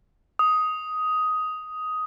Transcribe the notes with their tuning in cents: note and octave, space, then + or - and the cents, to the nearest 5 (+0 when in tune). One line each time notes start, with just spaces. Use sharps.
D#6 +10